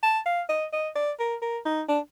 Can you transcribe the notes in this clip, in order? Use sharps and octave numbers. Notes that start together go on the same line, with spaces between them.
A5
F5
D#5
D#5
D5
A#4
A#4
D#4
D4